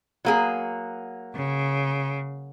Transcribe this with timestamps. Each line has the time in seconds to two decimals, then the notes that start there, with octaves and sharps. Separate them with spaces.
0.25 F#3 A#3 G#4
1.35 C#3